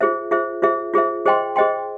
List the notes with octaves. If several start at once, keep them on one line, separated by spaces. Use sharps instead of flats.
F4 G#4 C5 E5
F4 G#4 C5 E5
F4 G#4 C5 E5
F4 G#4 C5 E5
G#4 C5 D#5 G5 C6
G#4 C5 D#5 G5 C6